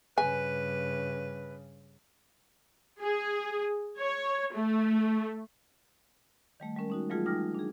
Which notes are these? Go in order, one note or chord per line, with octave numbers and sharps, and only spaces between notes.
G2 C#3 B4 G#5
G#4
C#5
A3
D#3 G3 A3
G3 G#3 C#4 A#4
C#4 D#4 F#4
E3 F#3 G3 A3 F4 G#4
G#3 D#4 G5 D6 F6 A#6
D4 G#4